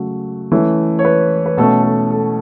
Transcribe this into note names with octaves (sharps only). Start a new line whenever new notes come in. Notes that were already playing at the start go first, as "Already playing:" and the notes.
Already playing: C#3 F#3 A3 F#4
E3 A3 C#4
C#5
B4
B4
B2 A3 C#4 A4
A4
A4